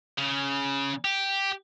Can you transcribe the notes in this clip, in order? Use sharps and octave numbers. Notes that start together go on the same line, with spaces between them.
C#3
G4